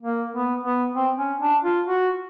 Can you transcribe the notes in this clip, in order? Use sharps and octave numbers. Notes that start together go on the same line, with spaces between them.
A#3
B3
B3
C4
C#4
D4
F4
F#4